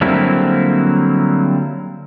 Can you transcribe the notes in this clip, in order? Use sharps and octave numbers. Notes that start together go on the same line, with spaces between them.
D3 F#3 G3 A#3 C4 E4